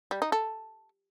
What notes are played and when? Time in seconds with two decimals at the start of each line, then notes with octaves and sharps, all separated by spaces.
0.11 G3
0.22 D#4
0.32 A4